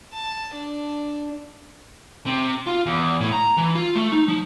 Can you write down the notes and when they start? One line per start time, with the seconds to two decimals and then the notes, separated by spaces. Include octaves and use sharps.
0.13 A5
0.54 D4
2.26 C3
2.67 F4
2.86 E2
3.21 A2
3.32 A#5
3.57 E3
3.75 F4
3.95 A3
4.12 D#4
4.28 F3